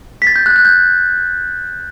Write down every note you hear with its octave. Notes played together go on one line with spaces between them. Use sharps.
B6
A6
G6
F#6
F#6
G6